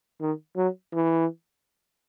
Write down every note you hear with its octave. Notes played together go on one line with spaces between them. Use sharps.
D#3
F#3
E3